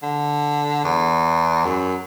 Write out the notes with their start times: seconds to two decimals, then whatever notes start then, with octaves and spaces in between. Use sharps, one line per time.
0.03 D3
0.84 E2
1.66 F#2